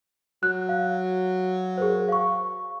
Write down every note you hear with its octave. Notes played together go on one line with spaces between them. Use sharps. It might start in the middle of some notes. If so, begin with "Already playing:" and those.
F#3 F#6
F5
G#4 A#4 C5
F5 C#6